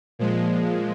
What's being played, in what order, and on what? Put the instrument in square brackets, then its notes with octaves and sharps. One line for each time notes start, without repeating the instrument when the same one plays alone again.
[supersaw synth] A#2 F3 G#3